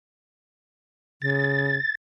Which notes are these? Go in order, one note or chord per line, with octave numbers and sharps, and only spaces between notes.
C#3 A6